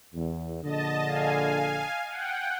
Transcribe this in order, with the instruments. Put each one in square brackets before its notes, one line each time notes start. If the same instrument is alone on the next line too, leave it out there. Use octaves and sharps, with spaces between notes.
[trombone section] E2
[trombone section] A#1 D3 [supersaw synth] D#5 A5
[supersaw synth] F5 G#5
F#5 G5